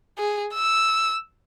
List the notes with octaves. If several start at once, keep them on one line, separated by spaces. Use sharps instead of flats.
G#4
E6